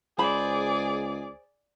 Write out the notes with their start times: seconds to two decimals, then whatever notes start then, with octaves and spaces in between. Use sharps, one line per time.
0.19 C#2 G#4 C5 D5 B5